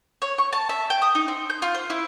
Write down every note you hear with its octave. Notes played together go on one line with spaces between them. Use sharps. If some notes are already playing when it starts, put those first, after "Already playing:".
C#5
C#6
A5
E5
G5
D#6
D#4
C4
G6
F4
C5
E4